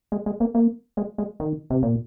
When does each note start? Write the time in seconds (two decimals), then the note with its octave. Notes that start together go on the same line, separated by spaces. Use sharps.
0.12 G#3
0.26 G#3
0.40 A#3
0.54 A#3
0.97 G#3
1.18 G#3
1.40 D#3
1.70 C3
1.83 A#2